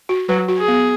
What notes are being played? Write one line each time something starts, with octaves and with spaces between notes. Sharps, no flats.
F#4
F#3 B4
F#4
G#4
B3